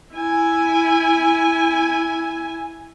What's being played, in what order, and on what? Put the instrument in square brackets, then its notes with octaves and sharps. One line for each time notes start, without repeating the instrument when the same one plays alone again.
[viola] E4 G#5